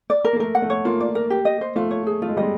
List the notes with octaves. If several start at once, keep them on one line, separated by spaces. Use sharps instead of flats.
D5
A#4
A#3
A3 A#4
F#5
A3
C#5
A#3 F4
D5
A#4
G4
D#5
C5
A3 F4
C#5
G#4
A3 F4
G#3
G3 D#5
G#3